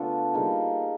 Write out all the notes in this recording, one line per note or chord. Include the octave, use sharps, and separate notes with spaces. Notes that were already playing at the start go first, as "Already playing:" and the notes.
Already playing: D3 A3 B3 D4 F4 A4
G3 A#3 D#4 G#4